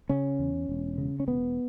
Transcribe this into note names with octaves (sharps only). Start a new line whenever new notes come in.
C#3 C#4
E2
E1
C#3
C#4
E1 B3